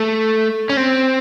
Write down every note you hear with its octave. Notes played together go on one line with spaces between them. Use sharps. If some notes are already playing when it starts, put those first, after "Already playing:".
Already playing: A3
C#4
C4